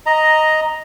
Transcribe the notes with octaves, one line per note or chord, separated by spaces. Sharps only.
D#5 A#5